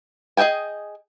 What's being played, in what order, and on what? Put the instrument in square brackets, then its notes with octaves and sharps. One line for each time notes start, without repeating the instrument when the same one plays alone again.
[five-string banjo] G#4 D#5 E5 G5 G#5